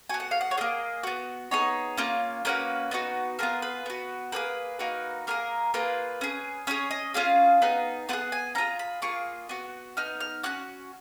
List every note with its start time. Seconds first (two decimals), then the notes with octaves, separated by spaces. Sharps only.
0.09 B3 F#4 G#5
0.20 F#5
0.31 F5
0.41 F#5
0.51 C#5
0.57 F4 G#4 D#5
0.61 A#3
1.03 B3 F#4
1.51 B3 D#4 G#4 C#5
1.97 A#3 C#4 F4
2.45 A#3 C#4 F#4 B4
2.91 B3 D#4 F#4
3.39 B3 F4 G#4 A#4
3.62 B4
3.86 B3 F#4
4.32 A#3 D#4 G#4 B4
4.79 A#3 D#4 F#4
5.27 A#3 F4 G#4 A#4
5.74 A#3 F4 G#4 B4
6.21 C#4 G#4
6.67 C#4 F4 G#4 C#5
6.91 D#5
7.14 C#4 F4 G#4 F5
7.62 B3 D#4 G#4
8.09 B3 F4 F#5
8.13 G#4
8.32 G#5
8.55 C#4 A#5
8.58 F4 G#4
8.79 B5
9.02 A#3 F4 G#4 C#6
9.49 B3 F#4
9.97 B3 D#4 F6
10.20 F6
10.43 C#4 F#4 F#6